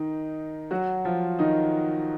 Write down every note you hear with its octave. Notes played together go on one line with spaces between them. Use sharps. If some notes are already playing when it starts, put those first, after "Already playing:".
Already playing: D#3 D#4
F#3 F#4
F3 F4
D#3 D#4